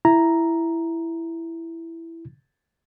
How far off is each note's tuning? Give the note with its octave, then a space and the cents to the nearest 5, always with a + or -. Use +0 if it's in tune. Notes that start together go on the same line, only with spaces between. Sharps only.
E4 +10 A#5 +0